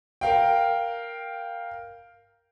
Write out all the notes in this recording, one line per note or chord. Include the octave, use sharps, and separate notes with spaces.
A#4 F5 G5